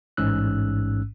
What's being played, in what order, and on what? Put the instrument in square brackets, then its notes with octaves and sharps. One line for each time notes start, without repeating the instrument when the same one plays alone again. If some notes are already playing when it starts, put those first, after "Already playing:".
[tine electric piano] A1 G#2 C#4 E6 F#6